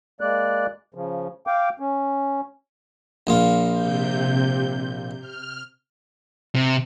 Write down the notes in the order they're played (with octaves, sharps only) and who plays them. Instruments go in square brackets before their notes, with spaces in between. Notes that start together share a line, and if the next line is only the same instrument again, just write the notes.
[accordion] G#3 A#3 D5 F#6
C#3 F3
F5 G5 D6
C#4
[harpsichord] A#1 A#2 F4
[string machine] C3 G6
F6
[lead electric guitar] C3